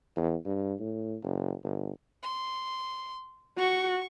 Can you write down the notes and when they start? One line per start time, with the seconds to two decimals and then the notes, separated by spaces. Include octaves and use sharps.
0.17 E2
0.45 G2
0.80 A2
1.22 F#1
1.64 G1
2.23 C6
3.58 F#4 C#6